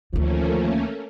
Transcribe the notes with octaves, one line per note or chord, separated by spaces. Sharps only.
D2 D#3 F3 A3 A#3 C#4